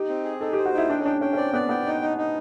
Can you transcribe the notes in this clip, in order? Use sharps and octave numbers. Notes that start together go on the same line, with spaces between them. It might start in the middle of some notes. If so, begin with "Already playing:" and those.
Already playing: D#4 G4
C4
G#4
D#4 A4
G4 C5
F#4
D#4 E4
D4 G5
C#4
D4 G5
C#4 G5
C#4
C4 D5
B3 D5
B3 G5
D#4
D#4
D#4